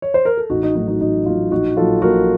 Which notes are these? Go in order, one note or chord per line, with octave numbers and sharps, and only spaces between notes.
C#5
C5
A#4
A4
A1 D#4 F#4
D#4
A2 F#3 A3 D#4 F#4
D#4 F#4
A1 D#4 F#4
A2 F#3 A3 F4
A#1 D#4 F#4
A#2 F#3 F4 A4
A#1 F#4 A#4